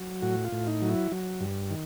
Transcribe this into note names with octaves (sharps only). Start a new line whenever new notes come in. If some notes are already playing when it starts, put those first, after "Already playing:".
Already playing: F#3
A2 F#4
F4
A2
D#4
F#3
E4
F#3
G2
D#3